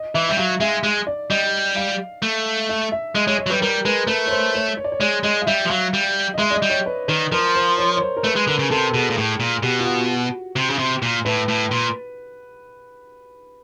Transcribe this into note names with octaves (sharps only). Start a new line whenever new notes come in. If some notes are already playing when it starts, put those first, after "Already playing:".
Already playing: D#5
E3 E5
G3 E5
F#3 F5
G#3 E5
G#3
D5
G3 D#5
F5
A3
E5
E5
G#3 D#5
G#3 C#5
C#5
F#3
G3 B4
G3 A#4
G#3 B4
A3 B4
C#5
C5
C#5
C#5
D5
C#5
G#3 D5
G#3 D#5
F5
G3 E5
F3
F#3 F5
G3
D#5
G#3 E5
D5
D#5
G3
C#5
B4
D#3 B4
F3 A#4
C5
C#5
C#5
C5
A#4
A3 B4
G#3
D3 A#4
C#3
C3 A4
B2 G#4
A#2
A2
A#2
B2 G4
F4
F#4
C3
C#3
C3
A#2
A2 B4
A2
A#2